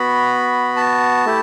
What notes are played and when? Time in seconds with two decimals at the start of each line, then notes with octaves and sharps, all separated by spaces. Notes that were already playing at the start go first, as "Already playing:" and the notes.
Already playing: B3 F#4 B5
0.76 A5
1.25 A3 E4 G4